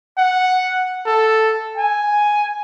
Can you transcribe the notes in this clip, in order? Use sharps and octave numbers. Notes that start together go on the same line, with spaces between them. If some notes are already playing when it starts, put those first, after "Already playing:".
F#5
A4
G#5